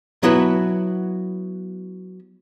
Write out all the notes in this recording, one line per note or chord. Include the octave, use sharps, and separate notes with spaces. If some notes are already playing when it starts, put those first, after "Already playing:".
F#3 B3 E4 F#4 B4